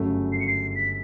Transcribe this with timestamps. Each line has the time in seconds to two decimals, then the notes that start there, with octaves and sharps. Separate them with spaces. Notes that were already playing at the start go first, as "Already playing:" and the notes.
Already playing: G1 F#2 C#3 F#3 A3
0.33 C7
0.40 C#7
0.47 C7
0.75 B6